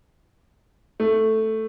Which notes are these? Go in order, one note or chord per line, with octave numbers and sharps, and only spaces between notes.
A3